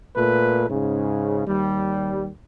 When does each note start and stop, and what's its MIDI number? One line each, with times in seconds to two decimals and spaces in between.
0.14 0.65 46
0.14 0.65 57
0.14 0.65 71
0.68 1.44 44
0.68 1.44 49
1.47 2.28 39
1.47 2.28 55